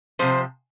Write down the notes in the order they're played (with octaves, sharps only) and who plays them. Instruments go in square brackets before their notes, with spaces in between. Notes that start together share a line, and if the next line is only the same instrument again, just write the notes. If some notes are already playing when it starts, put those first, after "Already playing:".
[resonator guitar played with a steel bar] C3 F3 C5